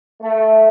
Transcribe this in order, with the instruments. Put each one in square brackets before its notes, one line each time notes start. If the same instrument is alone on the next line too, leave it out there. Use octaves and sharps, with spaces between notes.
[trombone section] A3